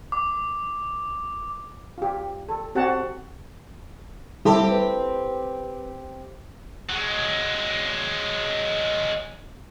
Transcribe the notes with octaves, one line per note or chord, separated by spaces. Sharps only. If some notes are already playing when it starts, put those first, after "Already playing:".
D6
F4 G4
A4
C4 F#4 G4 F#5 A5
G3 C4 E4 G4 A4
B4
F#3 G#3